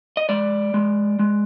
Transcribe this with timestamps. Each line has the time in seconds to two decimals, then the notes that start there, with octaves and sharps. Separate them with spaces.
0.17 D#5
0.29 G#3 D5
0.74 G#3
1.19 G#3